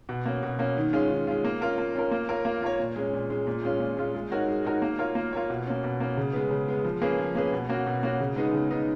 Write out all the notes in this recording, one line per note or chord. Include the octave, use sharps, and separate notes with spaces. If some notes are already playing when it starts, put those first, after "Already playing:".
B2
A#3 C#4
B2
A#3 C#4
D#3
G#3 C#4 F4
D#3
G#3 C#4 F4
A#3
C#4 F4 A#4
A#3
C#4 F4 A#4
A#3
F4 A#4 C#5
A#3
F4 A#4 C#5
A#2
G#3 C#4
A#2
G#3 C#4
A#2
G#3 C#4 F4
A#2
G#3 C#4 F4
G#3
D#4 F#4 A#4 C#5
G#3
D#4 F#4 A#4 C#5
A#3
F4 A#4 C#5
A#3
F4 A#4 C#5
B2
A#3 C#4
B2
A#3 C#4
C#3
G#3 B3
C#3
G#3 B3
F3
A#3 C#4 G#4 B4
F3
A#3 C#4 G#4 B4
B2
A#3 C#4 F#4
B2
A#3 C#4 F#4
C#3
G#3 B3 D#4
C#3
G#3 B3 D#4